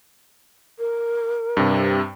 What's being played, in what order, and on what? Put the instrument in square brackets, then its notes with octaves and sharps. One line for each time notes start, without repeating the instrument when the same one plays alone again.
[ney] A#4
[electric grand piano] G2 C3